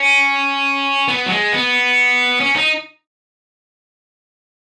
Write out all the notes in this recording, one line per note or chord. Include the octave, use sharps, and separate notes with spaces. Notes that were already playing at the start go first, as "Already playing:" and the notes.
Already playing: C#4
B3
F#3
G#3
B3
C#4
D#4